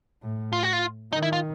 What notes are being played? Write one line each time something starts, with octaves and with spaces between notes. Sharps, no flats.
A2
F4
F#4
F4
D#3 D#4
E4
F4